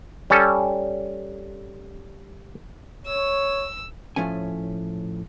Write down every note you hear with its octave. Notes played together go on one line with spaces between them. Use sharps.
G3 C#4 A4
C#5 E6
A2 F3 A3 C#4 G#5